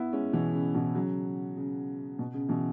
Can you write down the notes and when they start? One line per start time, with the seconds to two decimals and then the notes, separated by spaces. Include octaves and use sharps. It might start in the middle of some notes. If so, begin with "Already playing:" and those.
Already playing: B3 E4
0.13 G#3 C#4
0.33 B2 E3
0.54 C#3
0.74 B2 E3
0.95 C#3 F#3
1.57 C#3
2.19 B2
2.34 C#3
2.49 B2 E3